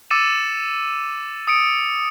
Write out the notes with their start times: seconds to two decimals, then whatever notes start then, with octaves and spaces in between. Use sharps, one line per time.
0.10 D6 E6 A6 C#7 D#7 E7
1.47 D#6 C#7 D7